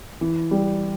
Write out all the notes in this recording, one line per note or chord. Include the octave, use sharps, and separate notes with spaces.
E3
G3